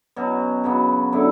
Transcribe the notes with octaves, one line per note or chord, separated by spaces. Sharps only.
B2 F#3 C#4
C#3 F#3 B3
D3 F#3 B3 E4